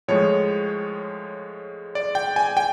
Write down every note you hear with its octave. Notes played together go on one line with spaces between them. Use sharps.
A2 F3 G#3 C#5
D5
G5
G#5
G5